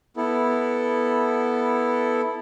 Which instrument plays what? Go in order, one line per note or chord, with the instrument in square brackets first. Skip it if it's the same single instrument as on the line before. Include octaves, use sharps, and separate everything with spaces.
[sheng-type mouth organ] B3 E4 A4